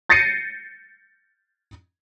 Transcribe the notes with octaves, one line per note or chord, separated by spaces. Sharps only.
G6 A6 A#6 C7 C#7 D#7